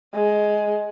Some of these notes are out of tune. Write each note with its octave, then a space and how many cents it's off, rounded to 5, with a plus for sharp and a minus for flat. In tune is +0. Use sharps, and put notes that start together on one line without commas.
G#3 +10